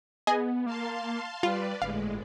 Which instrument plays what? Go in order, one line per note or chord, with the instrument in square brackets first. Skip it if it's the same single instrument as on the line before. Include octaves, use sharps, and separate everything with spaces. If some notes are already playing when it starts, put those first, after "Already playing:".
[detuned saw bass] B3 [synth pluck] G#4 D#5 G#5
[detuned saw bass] A#3 [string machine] F5 A5 C6
[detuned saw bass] G3 [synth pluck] F4 [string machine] B4 D5
[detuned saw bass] G1 [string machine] A2 G#3 [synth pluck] F5